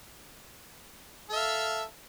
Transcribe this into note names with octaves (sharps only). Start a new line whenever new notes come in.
A4 E5 F5